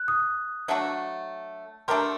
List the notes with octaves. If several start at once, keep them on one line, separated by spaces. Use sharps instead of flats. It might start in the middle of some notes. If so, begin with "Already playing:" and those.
Already playing: F#6
D#6
F#3 A3 D4 F#4
A3 D4 G4 A#4 C6